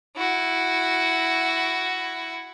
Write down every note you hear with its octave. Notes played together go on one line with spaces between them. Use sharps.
E4 F#4